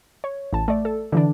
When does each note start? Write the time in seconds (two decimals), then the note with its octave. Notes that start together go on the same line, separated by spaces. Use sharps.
0.24 C#5
0.53 A1 A5
0.68 A3 D5
0.85 A4
1.12 D3 E3 D4